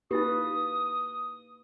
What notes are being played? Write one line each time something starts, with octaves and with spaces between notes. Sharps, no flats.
A#3 D#4 E4 G4 B4 D#6